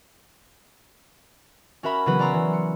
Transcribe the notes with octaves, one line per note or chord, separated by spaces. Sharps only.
C#4 F#4 A#4 E5 B5
C#3 E3 F#3 B3 F#4 B4
C#4 D5 A#5 C6 E6
E3
C#7